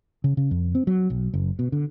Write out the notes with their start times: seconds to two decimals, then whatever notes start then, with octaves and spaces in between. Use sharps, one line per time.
0.24 C#3
0.37 C#3
0.51 F2
0.75 C4
0.87 F#3
1.10 B1
1.34 F#1
1.59 B2
1.72 D3